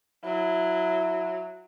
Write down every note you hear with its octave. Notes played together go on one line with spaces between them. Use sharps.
F#3 E4